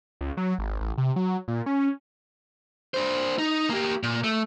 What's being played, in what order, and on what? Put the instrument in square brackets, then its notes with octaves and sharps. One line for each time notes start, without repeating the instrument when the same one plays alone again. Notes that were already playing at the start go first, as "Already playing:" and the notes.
[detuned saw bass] C#2
F#3
G#1
A1
C3
F#3
A#2
C#4
[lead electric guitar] D4 C5
D#4
A#3 G4
A#2
A3